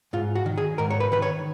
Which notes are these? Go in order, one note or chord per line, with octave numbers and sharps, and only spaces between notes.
G#2 F4
F#4
D#3
G#4
G#2 A#4
C#5
B4
D#3 B4
C#5